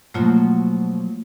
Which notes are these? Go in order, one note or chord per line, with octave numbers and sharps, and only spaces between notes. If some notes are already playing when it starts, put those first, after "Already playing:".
B2 F3 F#3 A3 A#3 F4